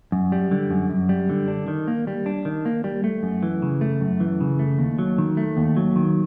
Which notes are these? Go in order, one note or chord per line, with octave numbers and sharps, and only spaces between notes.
F#2
G3
D3
F#2
F#2
G3
D3
D4
D#3
A#3
G3
D4
D#3
A#3
G3
A3
F#2
E3
C#3
A3
F#2
E3
C#3
A3
D#2
F#3
D#3
A3
D#2
F#3
D#3